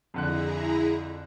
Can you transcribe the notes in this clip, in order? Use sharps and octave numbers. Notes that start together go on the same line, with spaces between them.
F2 D3 E4 G#4 A#5 F#6